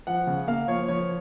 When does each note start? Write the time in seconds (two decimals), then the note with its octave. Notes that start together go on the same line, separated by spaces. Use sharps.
0.07 F3 F#5
0.27 C#3
0.47 A#3 F5
0.68 F3 C#5
0.88 F3 C#5